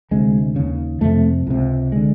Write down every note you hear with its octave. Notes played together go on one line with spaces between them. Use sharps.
D2 C3 G#3
D#2 C#3
F2 C3 A3
C#2 C3
D3 G#3